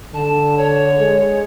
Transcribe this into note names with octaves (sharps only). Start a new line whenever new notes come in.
D3 A5
C#5
G#3 G#4